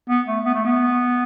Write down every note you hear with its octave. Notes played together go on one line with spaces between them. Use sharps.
B3
A3
B3
A3
B3